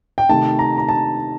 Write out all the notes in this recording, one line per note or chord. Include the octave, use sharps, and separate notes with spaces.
G5
C3 D#3 A3 A5
A#5
A#5
A5